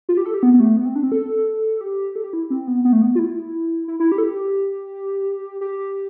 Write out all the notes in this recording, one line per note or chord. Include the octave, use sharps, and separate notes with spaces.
F4
G4
A4
G4
B3
B3
A3
B3
C4
D4
C4
A4
G4
A4
G4
E4
C4
B3
B3
A3
B3
F4
E4
E4
E4
G4
A4
G4
G4